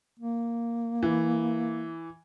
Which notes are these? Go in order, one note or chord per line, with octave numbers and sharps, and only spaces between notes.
A#3
E3